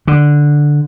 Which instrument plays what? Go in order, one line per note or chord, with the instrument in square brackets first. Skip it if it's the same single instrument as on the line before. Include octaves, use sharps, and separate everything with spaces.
[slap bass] D3